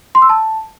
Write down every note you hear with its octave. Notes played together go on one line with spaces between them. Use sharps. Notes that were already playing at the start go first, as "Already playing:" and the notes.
C6
E6
A5